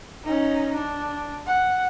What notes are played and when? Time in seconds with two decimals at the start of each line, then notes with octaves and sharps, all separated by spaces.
0.24 C#4 D#4
0.75 D4
1.46 F#5